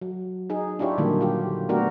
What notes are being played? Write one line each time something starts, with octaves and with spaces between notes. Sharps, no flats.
F#3
D#4 G#4
D4 E4 F4 G4 C#5
A#2 D3 D#3 F#3 G3 A#3
F4 G4
A3 B3 D4 F#4 G4 A#4